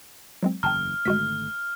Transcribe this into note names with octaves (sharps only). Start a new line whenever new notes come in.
F#3 G#3 C4
F#1 E2 G5 A5 A#5 F6
G#1 D3 G#3 A3 F#4 B6